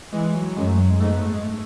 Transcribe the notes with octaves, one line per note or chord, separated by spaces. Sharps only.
E3 G#3
F#3
F#2 G#3
A3
F#3
G#3
G#2 A3
B3
A3
G#3
A3